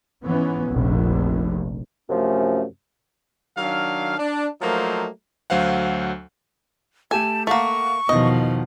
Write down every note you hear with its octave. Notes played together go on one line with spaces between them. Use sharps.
G#2 E3 B3 C#4
F1 A#1
F#2 C3 F3 A3 C#4
D#3 F#3 D4 F5
D4
F3 F#3 A3 A#3 D#4 C5
D2 F#3 C5 F5 F#5
A3 G4 A4 G#5 A5
A3 A#3 A4 F5 F#5 C#6
E2 B2 D#3 F3 D#5